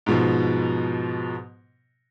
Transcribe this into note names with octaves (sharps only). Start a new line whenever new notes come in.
G#2 B2 F3